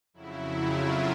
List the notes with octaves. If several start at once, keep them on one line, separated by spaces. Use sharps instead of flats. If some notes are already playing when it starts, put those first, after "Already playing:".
F2 C#3 F#3 E4
F4